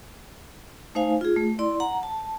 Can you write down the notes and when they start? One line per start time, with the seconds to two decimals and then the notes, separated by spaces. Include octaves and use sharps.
0.95 A3 D#4 C5 F5 G#5
1.21 F4 G#4
1.36 A3
1.59 E4 D5 C6
1.80 F#5 A#5
2.03 A5